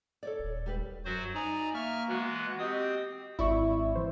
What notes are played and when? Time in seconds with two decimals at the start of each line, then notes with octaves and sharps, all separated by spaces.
0.23 A4 C#5 D5
0.39 D#1
0.66 G3 G4 B4
1.05 F#2 F#3 F#4 C5
1.35 D#4 D5 G#5 A#5
1.74 A#3 E5 C#6 F6
2.08 E3 G#3 B3 F#4 F#6
2.58 C4 F#4 G4 D#5 D#6
3.39 G#1 E4 D5 C#6
3.95 E3 C5